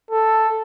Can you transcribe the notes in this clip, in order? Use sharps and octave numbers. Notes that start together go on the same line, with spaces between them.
A4